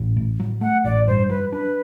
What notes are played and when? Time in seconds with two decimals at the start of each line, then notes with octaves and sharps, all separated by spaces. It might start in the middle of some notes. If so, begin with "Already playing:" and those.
Already playing: A1
0.16 A2
0.40 F#3
0.61 A3 F#5
0.84 A1 D5
1.07 G2 C5
1.29 F#3 B4
1.52 D4 B4